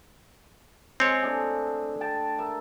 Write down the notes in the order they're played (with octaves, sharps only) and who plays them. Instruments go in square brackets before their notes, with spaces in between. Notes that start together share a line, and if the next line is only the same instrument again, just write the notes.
[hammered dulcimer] G#3 [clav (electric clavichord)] C4 C#5
[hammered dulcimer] A3 D4 G#4
G5 A5
A#4 E5